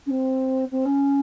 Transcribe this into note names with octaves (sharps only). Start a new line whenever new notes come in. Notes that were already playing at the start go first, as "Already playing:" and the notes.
C#4
C4
C4
C#4